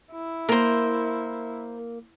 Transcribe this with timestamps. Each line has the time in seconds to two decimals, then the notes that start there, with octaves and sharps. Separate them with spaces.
0.12 E4
0.49 A#3 A#4 C5